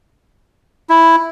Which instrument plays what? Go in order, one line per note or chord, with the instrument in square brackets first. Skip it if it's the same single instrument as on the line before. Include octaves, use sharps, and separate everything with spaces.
[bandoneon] E4